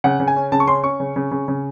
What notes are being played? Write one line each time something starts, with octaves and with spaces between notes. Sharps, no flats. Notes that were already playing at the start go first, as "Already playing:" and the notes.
C#3 F#5
C#3
G#5
C#4
C#3 A5
C#6
C#4 C6
C#4 C#6
C#3
C#3
C#3
C#3